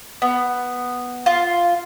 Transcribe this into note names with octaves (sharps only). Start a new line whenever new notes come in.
B3
F4